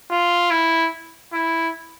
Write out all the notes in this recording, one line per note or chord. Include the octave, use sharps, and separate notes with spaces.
F4
E4
E4